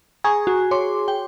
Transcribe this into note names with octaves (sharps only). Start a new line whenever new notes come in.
G#4 A#5 C#6 G#6
F#4
C#5 C6 D6
G5